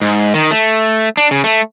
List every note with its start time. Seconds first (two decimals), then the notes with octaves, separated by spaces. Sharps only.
0.01 G#2
0.34 D#3
0.51 A3
1.17 D4
1.31 C#3
1.44 A3